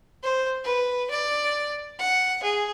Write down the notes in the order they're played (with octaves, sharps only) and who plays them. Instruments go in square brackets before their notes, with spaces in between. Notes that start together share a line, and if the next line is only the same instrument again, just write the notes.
[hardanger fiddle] C5
B4
D5
F#5
G#4